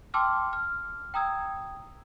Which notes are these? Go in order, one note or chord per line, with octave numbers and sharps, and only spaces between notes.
G5 A5 C6 D6 E6 F6
F6
G5 A#5 D#6 E6 G#6